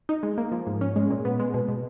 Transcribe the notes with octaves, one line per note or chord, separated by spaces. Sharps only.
D#4
G#3
A#3
F3
G#2
C#4
G#3
A#2
B3
G#3
B2
B2